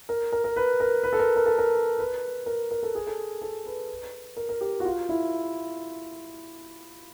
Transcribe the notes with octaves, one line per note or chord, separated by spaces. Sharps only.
A#4
A#4
A#4
B4
A#4
B4
A4
A#4
A#4
A4
A#4
B4
A#4
A#4
A4
G#4
A4
A4
B4
A#4
A#4
G4
F#4
F4
E4